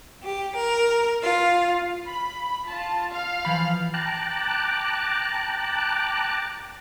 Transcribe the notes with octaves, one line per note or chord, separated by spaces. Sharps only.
G4
A#4
F4
B5
F4 A5
F5
E3 F3 B5
G5 A5 A#5 D6 F#6